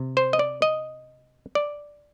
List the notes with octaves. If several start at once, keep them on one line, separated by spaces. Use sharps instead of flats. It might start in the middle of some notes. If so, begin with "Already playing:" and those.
Already playing: C3
C5
D#5
D5
D#5
D5